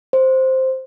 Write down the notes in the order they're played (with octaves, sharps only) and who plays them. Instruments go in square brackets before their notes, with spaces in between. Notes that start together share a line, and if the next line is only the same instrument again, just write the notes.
[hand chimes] C5